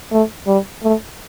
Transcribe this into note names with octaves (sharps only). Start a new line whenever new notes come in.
A3
G3
A3